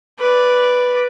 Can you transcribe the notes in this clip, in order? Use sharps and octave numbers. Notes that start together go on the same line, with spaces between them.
B4 D5